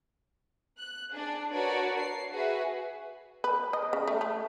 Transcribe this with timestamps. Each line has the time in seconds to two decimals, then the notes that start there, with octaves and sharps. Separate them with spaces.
0.77 F#6
1.12 D4 G#4
1.51 D4 F#4 A#4 B4 C#5 D5
1.98 C7
2.31 F#4 G#4 B4 E5
3.44 B4
3.73 D#5
3.93 C#3
4.07 A3
4.21 A3